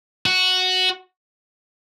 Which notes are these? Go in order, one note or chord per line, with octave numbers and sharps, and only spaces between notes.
F#4